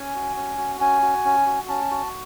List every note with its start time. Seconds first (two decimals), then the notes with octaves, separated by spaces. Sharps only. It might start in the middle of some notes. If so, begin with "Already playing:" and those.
Already playing: C#4 G#5
0.15 F#4
0.36 C#4
0.58 F#4
0.81 C#4 G#5
1.02 F#4
1.25 C#4
1.47 F#4
1.69 C#4 A5
1.91 F#4